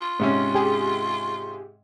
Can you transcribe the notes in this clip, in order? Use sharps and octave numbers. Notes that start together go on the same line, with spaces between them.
F4
G#2 C3 C#4
G4 G#4